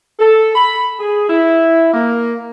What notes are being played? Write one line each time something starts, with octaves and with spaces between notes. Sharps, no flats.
A4
B5
G#4
E4
A#3